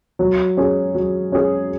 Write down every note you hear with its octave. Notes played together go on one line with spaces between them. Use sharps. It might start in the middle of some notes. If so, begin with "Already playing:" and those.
F#3
C#4 G#4
F#3
C#4 G#4